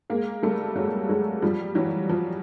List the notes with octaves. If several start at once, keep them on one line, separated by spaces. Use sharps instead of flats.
G#3 A#3
G3 A3
F#3 G#3
F#3 G#3
F3 G3
E3 F#3
F3